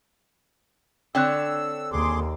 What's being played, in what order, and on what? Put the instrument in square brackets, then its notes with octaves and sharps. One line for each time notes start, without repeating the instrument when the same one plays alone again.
[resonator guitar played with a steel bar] D3 C4 C#5 [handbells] G5 F#6 [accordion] E6
[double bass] D#2 [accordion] G#4 C6 D6